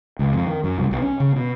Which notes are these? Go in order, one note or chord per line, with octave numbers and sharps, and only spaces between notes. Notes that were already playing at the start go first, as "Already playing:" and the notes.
C#2
F2
D#3
F#2
C2
B1
C#4
C#3
B2